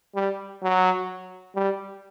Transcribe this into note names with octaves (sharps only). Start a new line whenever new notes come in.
G3
F#3
G3